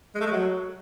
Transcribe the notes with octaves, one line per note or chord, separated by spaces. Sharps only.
G#3
A3
G#3
F#3